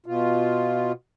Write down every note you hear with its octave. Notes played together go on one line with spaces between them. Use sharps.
B2 F4